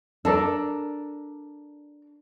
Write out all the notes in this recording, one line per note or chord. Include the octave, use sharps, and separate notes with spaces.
D4 A4 A#4 D5